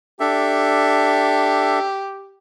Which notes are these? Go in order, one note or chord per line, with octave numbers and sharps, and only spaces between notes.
D4 G4 A4 E5